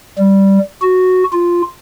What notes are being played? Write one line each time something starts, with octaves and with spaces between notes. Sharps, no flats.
G3
F#4
F4